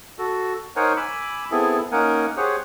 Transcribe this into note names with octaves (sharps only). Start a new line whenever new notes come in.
F#4 A4
D#4 A#4 C5 C#5 F#5 G#5
G#5 B5 D6 E6
B3 C4 E4 G#4 A4
A#3 C#4 D#4 A#4 F#5 G#5
G4 G#4 C5 C#5 F#5